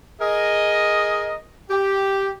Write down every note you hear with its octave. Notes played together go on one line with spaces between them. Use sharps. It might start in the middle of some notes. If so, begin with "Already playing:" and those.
G#4 A#4 D#5
G4